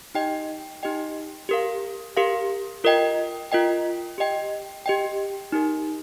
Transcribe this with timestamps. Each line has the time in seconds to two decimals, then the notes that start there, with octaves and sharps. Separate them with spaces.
0.15 D#4 G4 D#5 G5
0.83 D#4 G4 D#5 G5
1.49 G4 A#4 F5
2.17 G4 A#4 F5
2.84 F4 A#4 D#5 G5
3.52 F4 A#4 D#5 G5
4.18 G4 D#5 G5
4.86 G4 D#5 G5
5.52 D#4 G4 A#4